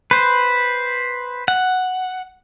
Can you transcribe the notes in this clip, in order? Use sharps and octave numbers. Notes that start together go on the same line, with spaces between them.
B4 C5
F#5